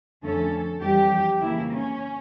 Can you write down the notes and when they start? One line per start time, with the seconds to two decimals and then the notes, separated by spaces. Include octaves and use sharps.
0.23 F2 D3 A3 C#4 A4
0.81 F2 E3 G3 G4
1.40 C#3 E3 A#3 E4
1.69 C#4